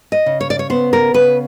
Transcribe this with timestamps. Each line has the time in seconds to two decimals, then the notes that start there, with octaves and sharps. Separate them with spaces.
0.12 D#5
0.26 C#3
0.41 C#5
0.50 D5
0.59 C#5
0.70 B3 C5
0.93 A#4
1.14 C#3 B4